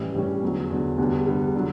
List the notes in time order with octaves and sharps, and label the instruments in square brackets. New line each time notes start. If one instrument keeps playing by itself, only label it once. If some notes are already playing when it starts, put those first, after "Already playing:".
Already playing: [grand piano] A2 E3 G3 C#4
A2 E3 G3 C#4
E2 D3 F#3
E2 D3 F#3
E2 D3 G3 B3
E2 D3 G3 B3
D3 F#3